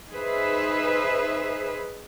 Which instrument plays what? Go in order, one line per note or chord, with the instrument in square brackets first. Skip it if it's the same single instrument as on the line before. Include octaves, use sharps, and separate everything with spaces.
[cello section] D#4 G#4 B4 C5 E5